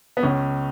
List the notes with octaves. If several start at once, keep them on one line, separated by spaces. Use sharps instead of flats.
B3
C#2 C#4